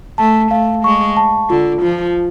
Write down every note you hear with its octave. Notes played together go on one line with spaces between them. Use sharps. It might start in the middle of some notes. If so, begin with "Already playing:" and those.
A3 A5
A3 F5
G#3 C#6
A5
D3 F4
F3 F4